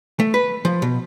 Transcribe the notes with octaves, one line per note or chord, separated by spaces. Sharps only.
A3
B4
F3
B2